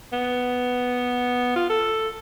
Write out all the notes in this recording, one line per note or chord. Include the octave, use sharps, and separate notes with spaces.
B3
F4
A4